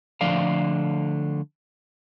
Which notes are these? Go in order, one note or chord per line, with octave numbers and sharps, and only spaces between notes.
D3 F3 A3 D5 F5